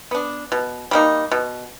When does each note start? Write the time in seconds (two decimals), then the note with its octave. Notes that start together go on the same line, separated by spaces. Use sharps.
0.11 B3 D4
0.52 B2
0.91 G3 A#3 D#4
1.32 B2